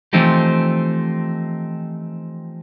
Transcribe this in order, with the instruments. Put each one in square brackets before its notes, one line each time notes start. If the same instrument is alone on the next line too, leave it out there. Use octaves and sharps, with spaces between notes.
[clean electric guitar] E3 F3 A3 C4 D#4 G4